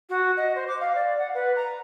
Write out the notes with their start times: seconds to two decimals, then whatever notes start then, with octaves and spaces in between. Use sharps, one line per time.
0.09 F#4
0.37 D#5
0.55 C5
0.67 D6
0.80 F5
0.95 D5
1.18 F#5
1.34 B4
1.56 A#5